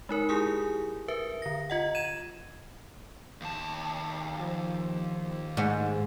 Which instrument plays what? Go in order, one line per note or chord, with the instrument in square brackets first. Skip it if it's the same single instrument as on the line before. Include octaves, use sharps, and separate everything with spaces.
[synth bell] G#3 D#4 A#4
E4 G4 G#4 G#5 D#6
A#4 B4 E5
D3 A#6
F4 D#5 F#5
G#6 D#7 E7
[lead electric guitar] D#2 A5
[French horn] F3
[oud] G#2 [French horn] D#4